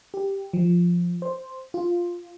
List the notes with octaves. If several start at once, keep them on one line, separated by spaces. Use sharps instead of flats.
G4
F3
C5
F4